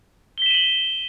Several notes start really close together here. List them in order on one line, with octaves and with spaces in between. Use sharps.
G7 B6 E7 D#7 F#7